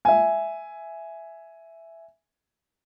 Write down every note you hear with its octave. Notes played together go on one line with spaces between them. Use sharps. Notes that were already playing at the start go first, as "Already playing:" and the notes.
E5 G#5